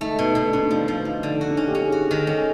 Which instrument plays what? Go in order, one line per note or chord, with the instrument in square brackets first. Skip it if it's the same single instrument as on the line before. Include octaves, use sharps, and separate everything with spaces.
[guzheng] A3 [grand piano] D#4
[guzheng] B2
[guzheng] B2 [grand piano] D#4
[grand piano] D4
[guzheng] B2
[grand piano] D4
[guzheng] F3 [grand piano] D4
[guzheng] F3
[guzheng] F3 [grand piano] D#4
[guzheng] D3
[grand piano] D#4 [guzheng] F#4
[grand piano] D4
[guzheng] C#4 [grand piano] D#4
[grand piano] G4
[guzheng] C#4 [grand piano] G#4
[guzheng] F#4
[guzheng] D#3 [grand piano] A4
[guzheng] C#4